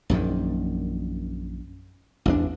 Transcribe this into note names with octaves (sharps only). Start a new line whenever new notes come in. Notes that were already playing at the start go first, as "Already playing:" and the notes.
A#1 F#2 A#2 D#3
A1 E2 D4